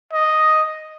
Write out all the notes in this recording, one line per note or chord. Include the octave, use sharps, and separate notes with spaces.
D#5